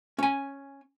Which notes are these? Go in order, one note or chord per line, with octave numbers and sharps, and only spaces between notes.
C#4 G#5